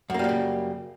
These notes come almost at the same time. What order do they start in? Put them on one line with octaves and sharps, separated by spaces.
F#2 A#3 G3 A#2 C#3